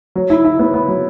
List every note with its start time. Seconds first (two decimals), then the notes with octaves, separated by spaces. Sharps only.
0.16 F#3
0.30 E4
0.44 E4
0.59 B3
0.74 B3
0.88 F#3